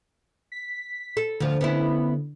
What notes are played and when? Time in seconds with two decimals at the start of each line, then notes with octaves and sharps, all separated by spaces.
0.52 B6
1.17 A4
1.40 D2 D3 F3
1.61 B3 C#4 E4